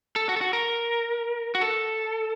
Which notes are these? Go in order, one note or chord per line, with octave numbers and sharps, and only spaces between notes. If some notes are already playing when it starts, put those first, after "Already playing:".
A4
F#4
A4
F#4
A#4
F#4
A4